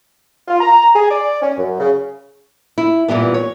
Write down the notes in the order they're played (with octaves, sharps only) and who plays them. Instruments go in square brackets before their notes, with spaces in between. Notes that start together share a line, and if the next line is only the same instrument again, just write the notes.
[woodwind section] F4
A#5
G#4
D5
C#4
F#2
C#3
[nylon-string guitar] E4
G2 A#2 E3 G3 B3
C#5